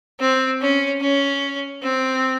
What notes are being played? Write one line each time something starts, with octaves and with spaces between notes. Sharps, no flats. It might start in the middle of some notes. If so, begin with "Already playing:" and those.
C4
C#4
C#4
C4